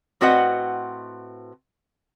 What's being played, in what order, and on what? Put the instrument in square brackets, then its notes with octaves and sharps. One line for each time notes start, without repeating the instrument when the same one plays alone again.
[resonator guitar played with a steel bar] A2 C4 F#4 B4 D#5 F#5